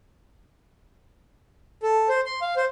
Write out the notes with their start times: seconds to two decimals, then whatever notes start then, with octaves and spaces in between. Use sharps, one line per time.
1.83 A4
2.09 C5
2.26 C6
2.42 F5
2.57 C5